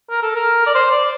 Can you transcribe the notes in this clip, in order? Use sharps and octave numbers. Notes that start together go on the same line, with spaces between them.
A#4
A4
A#4
D5
C5
D5